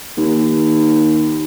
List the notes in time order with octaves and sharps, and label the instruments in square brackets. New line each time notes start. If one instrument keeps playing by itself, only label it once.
[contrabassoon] D#2